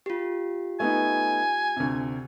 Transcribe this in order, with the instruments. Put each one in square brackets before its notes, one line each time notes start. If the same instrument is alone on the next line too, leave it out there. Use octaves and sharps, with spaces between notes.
[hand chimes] F4 G4
[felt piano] A3 B3 D#4 [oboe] G#5
[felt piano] D2 C3